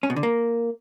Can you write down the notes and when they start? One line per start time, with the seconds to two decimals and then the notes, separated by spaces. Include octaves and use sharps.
0.03 C#4
0.10 B2
0.16 D3
0.23 A#3